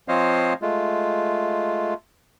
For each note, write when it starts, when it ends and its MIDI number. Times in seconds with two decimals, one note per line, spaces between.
0.08 0.53 53
0.08 0.53 60
0.08 0.53 72
0.08 0.53 73
0.08 0.53 75
0.08 0.53 77
0.62 1.94 56
0.62 1.94 57
0.62 1.94 65